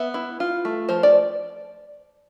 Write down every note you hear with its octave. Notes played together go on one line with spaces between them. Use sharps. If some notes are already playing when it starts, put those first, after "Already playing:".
Already playing: B3 E5
E4
F4
A3
F3 C5
D5